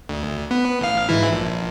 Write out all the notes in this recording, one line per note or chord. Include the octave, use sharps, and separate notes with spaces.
D2
B3
A1 F5
G#2 E3 E4
A#1